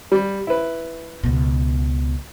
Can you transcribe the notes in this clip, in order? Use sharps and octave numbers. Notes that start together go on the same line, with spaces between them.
G3
E4 B4
C#2 B2